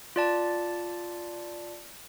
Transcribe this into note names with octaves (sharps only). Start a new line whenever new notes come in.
F4 D5 A5